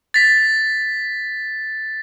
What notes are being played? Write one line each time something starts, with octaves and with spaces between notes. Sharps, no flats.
A6 B6